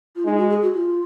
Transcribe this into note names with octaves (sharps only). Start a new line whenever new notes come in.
F4
G#3 D#4
F#4
G#4
F#4
F4